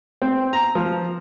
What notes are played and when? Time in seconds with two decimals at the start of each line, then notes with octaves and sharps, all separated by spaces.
0.22 C4
0.53 A#5
0.75 F3